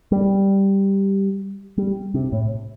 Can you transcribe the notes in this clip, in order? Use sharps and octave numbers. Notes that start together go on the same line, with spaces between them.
G3
G3
C3
A2